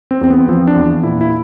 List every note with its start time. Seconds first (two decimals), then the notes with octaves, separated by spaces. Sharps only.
0.11 C4
0.21 E2 C4
0.30 B3
0.48 F3 C4
0.67 D4
0.76 E2
1.03 A#2 E4
1.21 E4